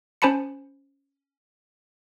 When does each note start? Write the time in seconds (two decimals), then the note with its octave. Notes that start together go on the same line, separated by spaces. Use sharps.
0.22 C#4 C5 G#5 A5 B5 C#7